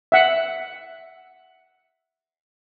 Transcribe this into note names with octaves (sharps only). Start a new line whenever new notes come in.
E5 F#5